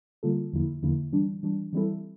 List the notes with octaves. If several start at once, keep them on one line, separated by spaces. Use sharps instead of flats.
D3 G3 A#3 F4 A4
E2 D3 F3 A#3 E4
E2 D3 F3 A#3 E4
E3 G3 D4
E3 G3 D4
E3 G3 C4 E4 A4